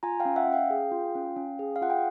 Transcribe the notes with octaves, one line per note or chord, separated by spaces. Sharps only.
F4 G#5 A#5
F5 G5
C#4
E5 F#5
C#4
F5 G5
G#4
F4
C#4
C#4
G#4
F5
F4 F#5
G5